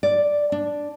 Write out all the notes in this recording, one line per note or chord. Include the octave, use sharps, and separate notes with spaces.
D5
D4